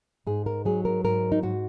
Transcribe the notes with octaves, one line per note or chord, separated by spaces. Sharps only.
G#2 G#4
A#4
F#3 G#4
A#4
G#2 A#4
D#4
G#2 F#4